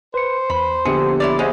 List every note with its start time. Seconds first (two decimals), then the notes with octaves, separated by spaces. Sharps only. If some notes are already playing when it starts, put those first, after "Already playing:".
0.14 B4 C5 C#7
0.50 E2 B5 C6
0.85 A#1 D3 B3 G4 G#4 C#7
1.20 E4 C#5 D5
1.39 G#3 B3 C#4 G#4 C5 E5